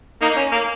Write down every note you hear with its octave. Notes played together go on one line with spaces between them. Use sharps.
A#3 D#4
C#4
A#3